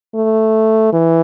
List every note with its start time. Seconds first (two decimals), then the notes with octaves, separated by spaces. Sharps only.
0.15 A3
0.93 E3